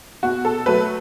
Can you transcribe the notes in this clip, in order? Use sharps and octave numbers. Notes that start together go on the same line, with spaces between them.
B2 F#4
A4
F#3 A3 B4